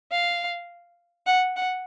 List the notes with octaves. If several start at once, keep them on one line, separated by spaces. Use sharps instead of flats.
F5
F#5
F#5